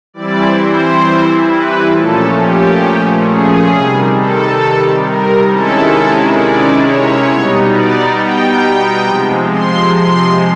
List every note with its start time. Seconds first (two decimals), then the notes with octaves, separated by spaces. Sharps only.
0.14 E3 G3 C4 E4 D5
0.57 C5
1.47 B4
1.91 A#2 F3 A3 C#4 A4
2.36 G4
3.26 G#4
3.70 C3 D#3 G3
4.15 A4
5.04 A#4
5.48 C3 D#3 G#3 C#4 E4 A4
6.37 D5
6.82 C#5
7.27 B2 G3 B3 D#4
7.71 D5
8.15 G5
9.05 C3 F3 G#3
9.50 C6
9.95 C6